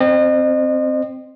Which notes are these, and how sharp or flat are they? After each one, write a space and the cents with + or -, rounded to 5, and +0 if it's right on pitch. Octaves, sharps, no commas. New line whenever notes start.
C4 +0 C5 +0 D#5 -35